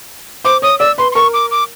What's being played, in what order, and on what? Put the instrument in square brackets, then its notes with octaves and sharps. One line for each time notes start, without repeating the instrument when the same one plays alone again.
[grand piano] C5 [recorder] D6
[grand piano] C#5 [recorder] D#6
[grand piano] D5 [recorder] E6
[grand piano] B4 [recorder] C6
[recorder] C6
[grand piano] A#4 [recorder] C#6
[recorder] D6
D6